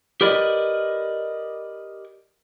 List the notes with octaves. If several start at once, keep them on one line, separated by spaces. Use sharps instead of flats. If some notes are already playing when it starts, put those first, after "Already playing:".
G4 A#4 B4 D5 D#5